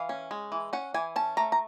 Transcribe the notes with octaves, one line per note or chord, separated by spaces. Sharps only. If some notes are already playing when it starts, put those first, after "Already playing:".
Already playing: E3 F5
C#4
G#3
E3
C#4 F#5
E3 G#5
C#4 A5
A3 A#5
A#5